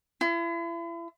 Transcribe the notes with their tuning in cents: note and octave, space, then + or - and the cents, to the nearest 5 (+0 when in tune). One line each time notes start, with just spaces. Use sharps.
E4 +40